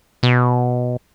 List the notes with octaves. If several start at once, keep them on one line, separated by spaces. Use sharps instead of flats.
B2